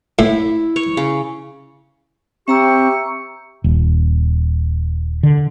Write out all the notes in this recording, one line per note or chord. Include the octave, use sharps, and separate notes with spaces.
A2 E4
C#5
C#3
C4 G4 E5 A#5 C#6 E6
D#1
D3